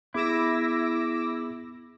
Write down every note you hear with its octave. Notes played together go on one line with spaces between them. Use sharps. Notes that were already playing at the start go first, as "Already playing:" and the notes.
B3 E4 G#4 D6 E6 A#6